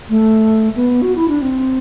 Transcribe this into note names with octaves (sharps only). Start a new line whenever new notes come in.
A3
B3
F#4
E4
D4
C4